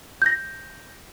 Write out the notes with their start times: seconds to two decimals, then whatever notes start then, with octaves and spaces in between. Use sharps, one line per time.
0.22 G6 A#6